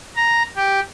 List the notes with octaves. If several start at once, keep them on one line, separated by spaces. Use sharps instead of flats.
A#5
G4